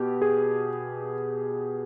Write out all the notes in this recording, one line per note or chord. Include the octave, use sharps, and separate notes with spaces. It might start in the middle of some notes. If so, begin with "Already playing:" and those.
Already playing: B2 G4
G#4